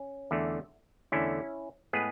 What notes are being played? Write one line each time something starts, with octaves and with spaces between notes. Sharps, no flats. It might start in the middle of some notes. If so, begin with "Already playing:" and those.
Already playing: C#4
E2 D3 A3
E2 D3 A3 C#4 E4
A2 G#3 B3 G#4 B4